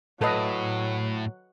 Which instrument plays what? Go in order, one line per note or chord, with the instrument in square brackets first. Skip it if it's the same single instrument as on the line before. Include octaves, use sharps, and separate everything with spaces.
[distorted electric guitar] A2 [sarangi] F#3 [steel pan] A4 B4 D#5